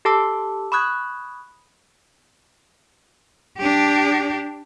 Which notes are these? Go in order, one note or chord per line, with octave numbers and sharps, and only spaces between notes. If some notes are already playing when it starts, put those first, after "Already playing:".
G4 A4 A5 D6 E6
B5 C#6 D#6 F#6 G#6
D4 G4